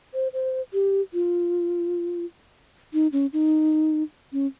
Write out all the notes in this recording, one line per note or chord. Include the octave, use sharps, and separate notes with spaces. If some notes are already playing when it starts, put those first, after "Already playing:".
C5
C5
G4
F4
D#4
C#4
D#4
C#4